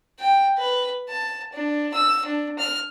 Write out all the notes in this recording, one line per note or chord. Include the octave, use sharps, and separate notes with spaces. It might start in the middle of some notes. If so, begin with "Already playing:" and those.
G5
B4
A5
D4
E6
D4
F6